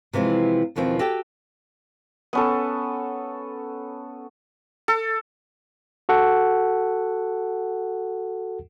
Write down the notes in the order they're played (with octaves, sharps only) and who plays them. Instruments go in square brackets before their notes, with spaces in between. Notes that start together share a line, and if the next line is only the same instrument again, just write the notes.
[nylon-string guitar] C3 E3 F3 G#3
E2 B2 D#3 F3 C4
F#4 G4 A4 G5
[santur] B3 C#4 A4
A4
[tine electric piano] F#4 A4 F#5